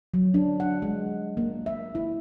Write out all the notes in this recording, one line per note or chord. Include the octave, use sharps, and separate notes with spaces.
F#3
D4
F#5
G#3
A#3
E5
E4